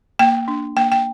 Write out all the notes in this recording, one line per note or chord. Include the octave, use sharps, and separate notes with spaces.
A#3 G5
D4
A#3 G5
G5